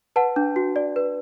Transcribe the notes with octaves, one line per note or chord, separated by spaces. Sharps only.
B4 F#5 A5
D4
F#4
D5
B4